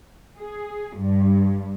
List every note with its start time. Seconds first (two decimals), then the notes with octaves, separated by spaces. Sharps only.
0.38 G#4
0.97 G2